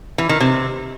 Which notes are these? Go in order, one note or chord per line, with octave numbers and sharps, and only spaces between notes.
E3
D#3
C3